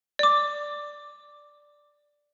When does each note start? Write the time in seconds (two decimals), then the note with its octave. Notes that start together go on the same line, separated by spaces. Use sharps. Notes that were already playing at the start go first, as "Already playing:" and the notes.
0.19 D5 D6